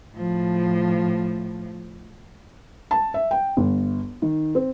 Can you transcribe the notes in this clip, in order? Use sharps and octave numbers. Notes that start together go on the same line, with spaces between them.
A2 F3
A5
E5
G5
G1
D#3
C4